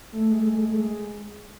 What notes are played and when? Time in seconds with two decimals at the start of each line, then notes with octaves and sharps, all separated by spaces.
0.12 A3
0.32 G#3
0.39 A3
0.47 G#3
0.56 A3
0.63 G#3
0.71 A3
0.79 G#3